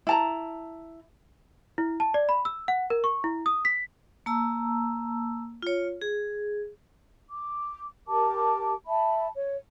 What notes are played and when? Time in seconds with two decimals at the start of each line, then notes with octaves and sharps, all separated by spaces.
0.07 E4 A5 A#5
1.78 E4
2.00 A5
2.14 D5
2.29 B5
2.45 E6
2.68 F#5
2.90 A#4
3.04 C#6
3.24 E4
3.46 D#6
3.65 B6
4.26 A#3 A5 A#5 E6
5.62 F4 C#5
6.02 G#4
7.30 D6
8.08 G4 A#4 A5 D6
8.87 E5 A5 B5
9.36 C#5